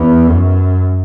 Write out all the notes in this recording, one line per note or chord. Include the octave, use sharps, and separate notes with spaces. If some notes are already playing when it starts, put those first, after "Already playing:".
Already playing: E2
F#2